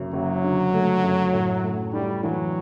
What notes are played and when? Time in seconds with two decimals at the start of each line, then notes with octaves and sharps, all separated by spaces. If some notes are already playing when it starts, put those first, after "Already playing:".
Already playing: F#1 F#2
0.13 F#1 F#3
0.43 D3
0.73 A3
1.03 F#2
1.33 A2
1.63 A3
1.93 G3 E4
2.23 E3 F#3